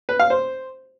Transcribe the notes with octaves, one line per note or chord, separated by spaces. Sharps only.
B4
F5
C5